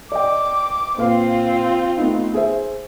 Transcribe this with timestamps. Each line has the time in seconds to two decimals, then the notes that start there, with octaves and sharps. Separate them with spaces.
0.12 D5 D#5 G5 D6
0.98 A#2 C4 F4 B4 F5
1.98 A3 B3 D#4
2.34 G#4 C5 E5